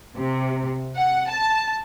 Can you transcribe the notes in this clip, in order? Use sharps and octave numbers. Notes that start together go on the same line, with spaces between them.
C3
F#5
A5